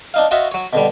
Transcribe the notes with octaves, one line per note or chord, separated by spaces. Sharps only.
D4 D#4 F5
F4 F#4 C#5 D#5 E5
F#3 C#5
B2 D3 G3